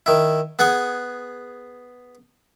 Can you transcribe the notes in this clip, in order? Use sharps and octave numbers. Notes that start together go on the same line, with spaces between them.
D#3 E4
B3 G#4 F#5 G#5